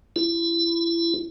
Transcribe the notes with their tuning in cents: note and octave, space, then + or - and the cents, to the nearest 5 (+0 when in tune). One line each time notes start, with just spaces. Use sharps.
E4 +30